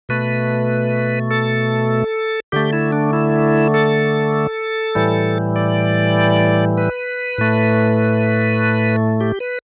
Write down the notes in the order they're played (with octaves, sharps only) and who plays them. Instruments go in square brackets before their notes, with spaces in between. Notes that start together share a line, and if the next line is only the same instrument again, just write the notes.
[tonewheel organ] B2 A3 B4
A4
D3 A3 G4
E4
D4
E4
A4
A2 E3 G3
D5
B4
A2 A3
G4
B4